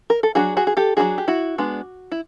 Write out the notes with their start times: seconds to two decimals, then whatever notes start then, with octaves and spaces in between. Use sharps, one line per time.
0.10 A#4
0.23 A4
0.35 F#3 A#3 D4 F#4 G#4
0.57 F#4 G#4
0.67 G#4
0.77 G4 A4
0.97 F#3 A#3 D4 F#4 G#4
1.18 G4
1.28 E4 F#4
1.58 G#3 B3 D4
2.12 E4